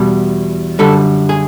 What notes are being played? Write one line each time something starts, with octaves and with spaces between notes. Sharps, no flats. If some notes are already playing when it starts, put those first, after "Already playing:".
Already playing: E2 B2 G3
F#2 D3 G3 A4
G#4